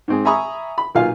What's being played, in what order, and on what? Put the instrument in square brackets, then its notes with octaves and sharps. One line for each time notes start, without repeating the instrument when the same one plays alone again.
[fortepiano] G#2 C4 G#4
E5 G#5 A#5 B5 C#6 D#6
B5
B1 A#2 F4 F5 G#5